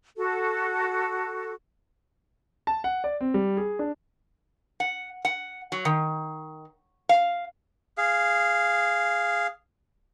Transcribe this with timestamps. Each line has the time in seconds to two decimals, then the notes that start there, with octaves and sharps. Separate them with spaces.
0.16 F#4 A4
2.67 A5
2.84 F#5
3.04 D5
3.21 C4
3.34 G3
3.57 G#4
3.79 D4
4.80 F#5
5.25 F#5
5.72 F#3
5.85 D#3
7.09 F5
7.98 G#4 F5